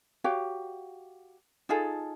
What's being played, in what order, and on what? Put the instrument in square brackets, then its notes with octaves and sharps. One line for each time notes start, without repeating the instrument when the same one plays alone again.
[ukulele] F#4 G4 C#5 F5
D#4 F4 G#4 A4